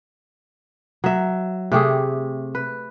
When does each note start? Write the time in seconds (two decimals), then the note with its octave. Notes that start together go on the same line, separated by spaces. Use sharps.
1.04 F#3 E5
1.72 C3 A3 G4 G#4
2.55 B4